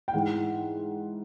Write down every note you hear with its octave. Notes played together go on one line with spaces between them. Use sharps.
G5
G#2 E3 F#5